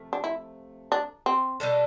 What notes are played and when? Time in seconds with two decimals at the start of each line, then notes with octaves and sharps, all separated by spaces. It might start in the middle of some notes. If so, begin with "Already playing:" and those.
Already playing: C3 F3 A3
0.13 D4
0.24 E4
0.92 D4
1.26 C4
1.60 B2 G3 D4 A4